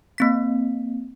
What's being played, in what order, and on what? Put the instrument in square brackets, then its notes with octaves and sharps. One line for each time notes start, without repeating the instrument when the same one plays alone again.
[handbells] A#3 C4 B6